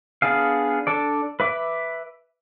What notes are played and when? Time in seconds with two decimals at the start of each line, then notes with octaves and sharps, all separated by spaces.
0.22 B3 D4 G#4 F5
0.87 D4 A4 D5
1.40 B4 E5 D6